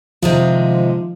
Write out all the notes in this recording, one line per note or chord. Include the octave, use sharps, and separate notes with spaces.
C3 D#3 F3 G#3